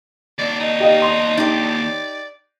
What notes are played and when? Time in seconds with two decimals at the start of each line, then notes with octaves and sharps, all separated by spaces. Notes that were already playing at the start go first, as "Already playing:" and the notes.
0.38 D#2 D4 D5
0.60 D#4
0.80 G4 D#5 F5
1.02 C6 F7
1.37 D#4 G4 D5